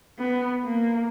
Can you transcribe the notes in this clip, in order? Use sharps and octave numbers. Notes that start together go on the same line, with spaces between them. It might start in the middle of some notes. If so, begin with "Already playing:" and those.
B3
A#3